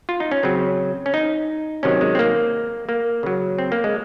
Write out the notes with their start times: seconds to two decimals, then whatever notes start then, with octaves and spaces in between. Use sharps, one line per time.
0.09 F4
0.20 D#4
0.32 C#4
0.43 C#3 F#3 C4
1.06 C#4
1.14 D#4
1.83 C3 D#3 F#3 C#4
2.01 G#3
2.15 C4
2.19 A#3
2.89 A#3
3.23 C#3 F#3
3.58 C4
3.72 A#3
3.84 G#3